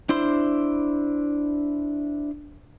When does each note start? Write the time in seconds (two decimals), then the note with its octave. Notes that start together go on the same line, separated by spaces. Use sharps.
0.09 D4 E4 C5 C6